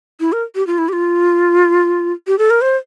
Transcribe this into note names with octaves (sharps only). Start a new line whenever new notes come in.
E4
A#4
G4
F4
E4
G4
F4
G4
A4
A#4
C5